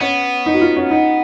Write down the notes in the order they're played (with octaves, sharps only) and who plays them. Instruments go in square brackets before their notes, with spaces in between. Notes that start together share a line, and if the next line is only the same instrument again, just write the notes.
[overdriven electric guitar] B3 [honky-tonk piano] C#4
[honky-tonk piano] D#4
F#4
F4
C#4
D#4